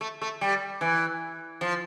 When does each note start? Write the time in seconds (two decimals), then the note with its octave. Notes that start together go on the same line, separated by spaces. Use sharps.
0.01 A3
0.22 A3
0.41 G3
0.81 E3
1.61 F3